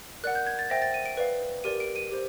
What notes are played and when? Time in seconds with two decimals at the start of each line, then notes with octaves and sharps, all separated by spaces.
0.24 A#4 D5 F#5 F#6
0.35 G6
0.47 G#6
0.59 A6
0.70 C5 E5 G5 A#6
0.82 A6
0.94 D#7
1.06 D7
1.17 B4 D5 F5
1.64 G4 A#4 D5 D#7
1.80 D7
1.96 D#7
2.11 G4 C5